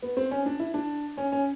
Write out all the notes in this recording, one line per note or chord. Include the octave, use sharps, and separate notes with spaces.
B3
C4
C#4
D4
E4
D4
C#4
C#4